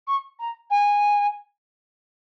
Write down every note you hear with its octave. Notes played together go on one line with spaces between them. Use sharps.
C#6
A#5
G#5